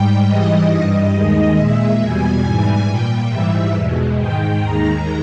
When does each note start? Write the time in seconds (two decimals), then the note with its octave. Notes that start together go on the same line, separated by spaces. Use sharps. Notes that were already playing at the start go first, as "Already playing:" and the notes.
Already playing: G#2 G3 G5
0.27 G#2 E3 G3 D#5
0.70 G2 G3 D#5
1.13 D#2 D#3 G#3 D#5
1.57 A#2 G#3 E5
2.00 E2 B2 G3 G#5
2.43 G#2 E3 G3 G#5
2.87 A#2 G3 G5
3.29 G#2 E3 G3 E5
3.74 E2 B2 G#3
4.16 G#2 D#3 G#3 G5
4.59 D#2 D#3 G#3 A#5